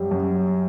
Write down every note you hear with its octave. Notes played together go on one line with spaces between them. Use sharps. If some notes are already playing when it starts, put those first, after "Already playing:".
Already playing: F#2 G3
F#2